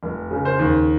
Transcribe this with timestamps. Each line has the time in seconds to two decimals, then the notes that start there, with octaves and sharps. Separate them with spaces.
0.03 F1
0.31 C#3
0.45 C5
0.59 D#2